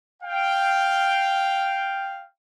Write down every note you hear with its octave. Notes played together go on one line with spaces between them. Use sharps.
F5 G5